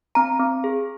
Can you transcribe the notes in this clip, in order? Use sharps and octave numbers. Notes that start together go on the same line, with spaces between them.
C4 A#5
C4
G#4